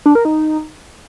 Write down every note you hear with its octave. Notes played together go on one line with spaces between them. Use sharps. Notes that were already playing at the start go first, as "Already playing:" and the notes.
D4
A#4
D#4